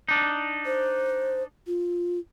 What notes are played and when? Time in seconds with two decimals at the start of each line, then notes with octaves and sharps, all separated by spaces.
0.09 D4 D#4
0.66 C5
1.67 F4